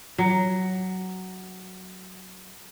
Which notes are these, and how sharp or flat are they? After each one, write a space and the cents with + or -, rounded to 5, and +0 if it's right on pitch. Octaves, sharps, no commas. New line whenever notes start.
F#3 +10